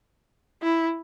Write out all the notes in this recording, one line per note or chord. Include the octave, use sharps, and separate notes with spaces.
E4